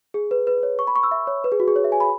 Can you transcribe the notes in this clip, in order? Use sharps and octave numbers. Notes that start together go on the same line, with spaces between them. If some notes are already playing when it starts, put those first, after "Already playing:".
G#4
B4
B4
C#5
C#6
B5
C#6
E6
E5
C#5
B4
G#4
F#4
G#4
C#5
E5
G#5
B5